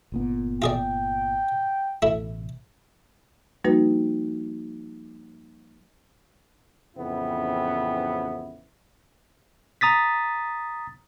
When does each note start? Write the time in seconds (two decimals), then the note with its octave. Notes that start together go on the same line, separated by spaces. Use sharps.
0.12 G1 A#2 B3
0.62 F4 G#4 D5 G5
2.02 A1 B2 A3 E4
3.64 F3 G3 A#3 D#4 F#4 B4
6.97 A1 F2 C#3 B3 C4 E4
9.81 A#5 D#6 A6 B6